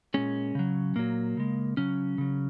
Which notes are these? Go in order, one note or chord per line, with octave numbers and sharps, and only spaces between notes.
A#2 G#3 C#4
C#3 F#3
A#2 F#3 A#3
C#3 G#3
C#3 F#3 C#4
C#3 F#3